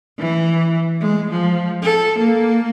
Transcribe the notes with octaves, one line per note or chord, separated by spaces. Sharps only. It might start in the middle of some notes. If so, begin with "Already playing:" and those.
E3
G#3
F3
A4
A#3